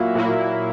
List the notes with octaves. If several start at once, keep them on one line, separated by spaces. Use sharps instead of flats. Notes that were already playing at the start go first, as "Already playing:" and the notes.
Already playing: A#2 F#3 A#3 E4
A#2 F#3 A#3 E4